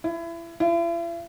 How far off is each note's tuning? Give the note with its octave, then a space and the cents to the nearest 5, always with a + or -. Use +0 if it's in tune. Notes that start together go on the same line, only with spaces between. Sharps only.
E4 +30
E4 +45